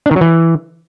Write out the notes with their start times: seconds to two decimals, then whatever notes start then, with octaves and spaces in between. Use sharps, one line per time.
0.06 D4
0.11 D#3
0.16 F#3
0.21 E3